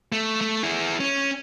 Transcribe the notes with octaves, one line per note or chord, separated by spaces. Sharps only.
A3
A3
E4 G#4
C#4